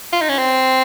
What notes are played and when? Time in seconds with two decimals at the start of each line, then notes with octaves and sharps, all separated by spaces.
0.13 F4
0.21 D#4
0.29 C#4
0.38 C4